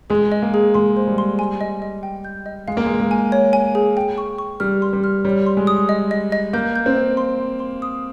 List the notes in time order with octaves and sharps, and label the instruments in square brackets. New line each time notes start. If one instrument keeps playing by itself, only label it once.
[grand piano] G#3 [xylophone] G#4
[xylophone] D#5
[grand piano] A#3
[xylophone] G#4
[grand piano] G#3 [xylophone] C6
[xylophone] C5
[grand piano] G3
[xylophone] C6
G#5
D#5
D#5
G5
G6
D#5
[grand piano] G#3 [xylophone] F5
[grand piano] A#3
[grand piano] G#3 [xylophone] F5
[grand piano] G#3
[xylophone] G#5
C#5
G#5
G#4
G5
C#6
C#6
[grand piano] G3 [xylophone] F6
[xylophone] C6
[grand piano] G3
[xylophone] F6
[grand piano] G3 [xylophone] C#5
[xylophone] C6
[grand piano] G#3
[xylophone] D#6
D#5
D#5
D#5
[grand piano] A#3 [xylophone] G6
[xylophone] G6
[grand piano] C4
[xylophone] F5
C6
F5
C6
D#6